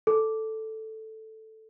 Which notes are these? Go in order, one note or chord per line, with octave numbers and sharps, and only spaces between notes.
A4